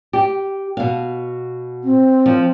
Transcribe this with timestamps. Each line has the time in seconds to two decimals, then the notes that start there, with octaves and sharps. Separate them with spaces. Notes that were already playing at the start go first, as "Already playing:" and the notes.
0.13 G4
0.77 B2 F5
1.84 C4
2.26 F3